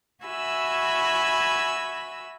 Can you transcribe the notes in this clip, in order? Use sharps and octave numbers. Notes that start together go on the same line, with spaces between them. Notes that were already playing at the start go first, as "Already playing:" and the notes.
F#4 E5 G#5 B5 E6